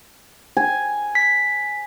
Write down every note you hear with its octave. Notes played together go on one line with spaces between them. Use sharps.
G#5
B6